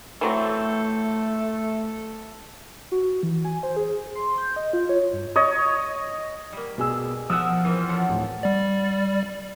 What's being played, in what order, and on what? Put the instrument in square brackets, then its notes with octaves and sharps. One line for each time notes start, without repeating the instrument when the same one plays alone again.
[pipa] E3 F#3 C4 [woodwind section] A3 [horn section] A4
[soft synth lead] F#4
E3
G#5
C5
G#4
C6
G6
D#5
F4
C#5
G2
[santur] C#5 D#5
[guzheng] G3 A#3
[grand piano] B2 G#4 E6
[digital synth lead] F3 [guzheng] A#4 E5 F#5 [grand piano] D#6 E6 F#6
[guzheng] E3 A#3 C4
C#3 A4 F#5
[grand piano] D1
[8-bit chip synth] G3 D5